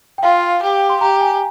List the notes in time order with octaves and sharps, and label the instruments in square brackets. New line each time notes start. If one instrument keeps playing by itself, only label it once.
[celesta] G5
[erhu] F4 [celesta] F5
[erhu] G4
[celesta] C6
[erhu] G4 [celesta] A#5
[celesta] G#5